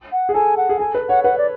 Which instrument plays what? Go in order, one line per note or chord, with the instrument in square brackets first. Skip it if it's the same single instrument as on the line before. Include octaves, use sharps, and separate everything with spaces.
[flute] F#5
[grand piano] G#4
[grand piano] A4 [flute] G#5
[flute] F#5
[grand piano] G#4
[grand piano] A4 [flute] G#5
[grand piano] B4
[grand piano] C#5 [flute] F#5
[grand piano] B4 [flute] F#5
[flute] D5